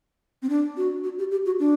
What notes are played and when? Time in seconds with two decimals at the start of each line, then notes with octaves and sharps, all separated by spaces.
0.42 C4
0.50 D4
0.77 F#4
1.04 F#4
1.19 G4
1.31 G4
1.46 F#4
1.60 D4